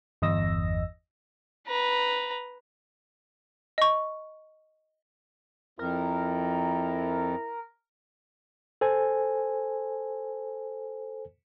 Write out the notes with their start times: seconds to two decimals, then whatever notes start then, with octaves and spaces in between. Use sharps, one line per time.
0.22 G1 E2 D#5 E6 A#6
1.67 B4 A#5
3.78 D#5 C#6
5.79 F2 E4 A#4
8.81 A4 C5 G#5